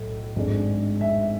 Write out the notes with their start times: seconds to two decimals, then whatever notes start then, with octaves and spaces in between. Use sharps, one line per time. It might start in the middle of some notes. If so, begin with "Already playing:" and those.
Already playing: B1 A2
0.36 G#1 G#2 G#3 D4
1.01 E5